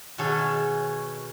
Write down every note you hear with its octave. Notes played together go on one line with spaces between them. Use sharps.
B2 D#3 G#4 A4 C#5